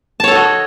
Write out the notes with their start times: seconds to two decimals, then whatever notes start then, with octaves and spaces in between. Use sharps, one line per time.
0.20 A5
0.24 C#5
0.28 A4
0.31 F#4
0.35 D#5